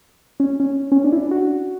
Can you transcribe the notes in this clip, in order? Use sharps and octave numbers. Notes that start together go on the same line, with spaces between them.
C#4
C#4
C#4
D4
E4
D4
F#4